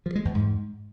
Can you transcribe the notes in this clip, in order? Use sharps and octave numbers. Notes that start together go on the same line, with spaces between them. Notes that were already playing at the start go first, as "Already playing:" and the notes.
F3
G#3
E2
G#2